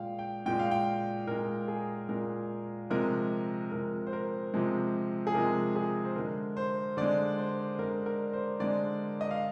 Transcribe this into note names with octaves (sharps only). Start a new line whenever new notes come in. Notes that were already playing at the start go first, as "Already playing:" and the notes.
Already playing: A#2 G#3 F5 G5
G5
A#2 G#3 G5
F5
G5
A#2 G#3 A#4
G#4
A#2 G#3 A#4
C3 F3 G#3 A#4
C3 F3 G#3 A#4
C5
A#4
C3 F3 G#3
G#4
C3 F3 G#3 A#4
G#4
C5
D3 G#3 A#4
C5
D3 G#3 D5
C5
D3 G#3 A#4
A#4
C5
D3 G#3 D5
D#5
F5